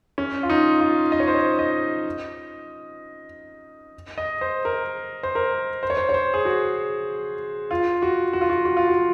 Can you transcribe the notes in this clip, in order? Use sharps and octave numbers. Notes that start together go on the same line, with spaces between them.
C#4
F4
D#4
F4
D#5
C#5
C5
C#5
D#5
D#5
C5
A#4
C5
A#4
C5
C#5
C5
C#5
C5
G#4
F#4
F4
F#4
F#4
F4
F#4
F#4
F4
F#4